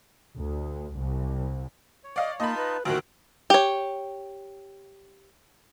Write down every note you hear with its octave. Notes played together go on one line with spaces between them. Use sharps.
D2
C2
C#5
D5 D#5 F5
A#3 D#4 F4 D#5 A5 B5
B4
D2 A#2 D#3 F#4 C5 A#5
G4 C#5